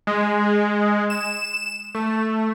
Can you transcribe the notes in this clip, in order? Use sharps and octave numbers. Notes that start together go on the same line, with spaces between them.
G#3
E7
A3